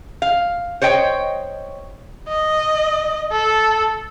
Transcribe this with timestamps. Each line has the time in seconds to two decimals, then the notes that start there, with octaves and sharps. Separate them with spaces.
0.22 F5
0.82 C5 C#5 D#5 G5
2.28 D#5
3.32 A4